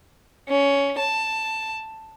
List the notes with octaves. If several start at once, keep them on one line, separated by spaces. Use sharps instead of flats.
C#4
A5